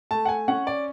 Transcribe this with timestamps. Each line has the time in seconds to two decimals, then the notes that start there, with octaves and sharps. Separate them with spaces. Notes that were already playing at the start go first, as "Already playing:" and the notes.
0.11 A3 A5
0.25 F#5
0.29 G#5
0.48 C#4 F#5
0.67 D5